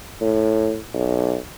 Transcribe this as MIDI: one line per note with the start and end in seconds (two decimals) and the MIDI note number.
0.21 0.77 45
0.94 1.36 35